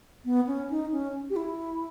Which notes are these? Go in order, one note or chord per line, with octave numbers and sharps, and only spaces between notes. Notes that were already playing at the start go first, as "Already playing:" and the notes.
B3
C#4
D#4
C#4
G4
E4